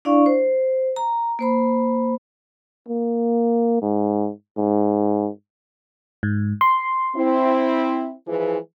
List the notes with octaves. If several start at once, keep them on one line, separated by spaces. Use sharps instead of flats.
D4 E4 D5 F5 C#6
C5
A#5
A#3 C5 B5
A#3
G#2
G#2
G#2
C6
C4 E4
E3 F3 G#3